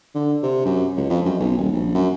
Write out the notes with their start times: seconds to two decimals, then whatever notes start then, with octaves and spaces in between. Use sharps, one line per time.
0.15 D3
0.43 C3
0.66 F#2
0.97 C#2
1.10 F2
1.26 F#2
1.40 B1
1.58 D#1
1.73 A#1
1.95 F#2